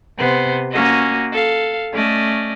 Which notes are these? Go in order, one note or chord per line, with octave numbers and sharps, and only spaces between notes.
C3 B3 C5
A#3 C#4 F#4 D#5
A4 F5
A3 C#4 D5 D#5